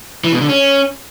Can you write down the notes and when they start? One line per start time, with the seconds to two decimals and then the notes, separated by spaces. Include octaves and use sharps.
0.24 E3
0.32 B2
0.41 D3
0.49 C#4